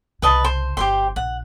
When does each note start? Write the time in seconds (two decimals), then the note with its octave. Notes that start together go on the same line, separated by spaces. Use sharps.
0.22 C2 C#3 B4 D#5 A5
0.45 C5
0.77 G1 F3 G4 C5 C6
1.16 A#1 F#5